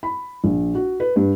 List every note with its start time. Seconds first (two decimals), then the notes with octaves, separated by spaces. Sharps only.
0.03 B5
0.44 A#1
0.75 F#4
1.00 B4
1.16 G2